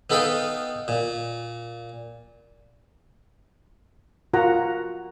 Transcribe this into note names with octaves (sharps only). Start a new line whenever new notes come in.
B3 D#4 A4 B4 F5 G5
A#2
F4 F#4 A#4 F#5 A#5